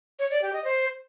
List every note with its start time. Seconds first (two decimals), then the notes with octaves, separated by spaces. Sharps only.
0.19 C#5
0.30 D5
0.42 G4
0.53 D#5
0.64 C5